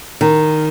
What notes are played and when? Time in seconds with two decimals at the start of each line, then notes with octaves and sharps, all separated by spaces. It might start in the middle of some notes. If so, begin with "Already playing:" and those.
0.21 D#3